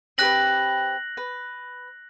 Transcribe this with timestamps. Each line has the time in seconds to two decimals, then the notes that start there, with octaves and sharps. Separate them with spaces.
0.18 C4 G4 B4 F#6 A#6 F#7
1.17 B4